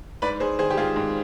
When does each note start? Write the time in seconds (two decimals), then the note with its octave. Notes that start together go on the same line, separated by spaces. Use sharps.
0.22 G#2 B4 D5
0.40 G#2 G#4 C5
0.59 D#3 G#4 C5
0.70 G4
0.77 G#2 F4 G#4
0.96 G#2